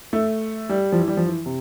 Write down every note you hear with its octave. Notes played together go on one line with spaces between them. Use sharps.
A3
G3
F3
E3
G3
F3
E3
C3